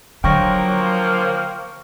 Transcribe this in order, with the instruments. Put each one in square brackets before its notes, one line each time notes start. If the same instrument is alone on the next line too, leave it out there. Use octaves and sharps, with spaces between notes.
[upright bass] D3 [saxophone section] F3 A#3 [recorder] F#3 [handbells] G5 C#6 A#6